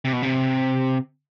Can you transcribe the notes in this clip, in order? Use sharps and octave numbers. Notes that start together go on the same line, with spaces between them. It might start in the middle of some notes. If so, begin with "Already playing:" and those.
C3
B2
C3